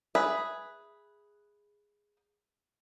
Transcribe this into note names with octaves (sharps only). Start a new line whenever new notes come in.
G#4 B4 E5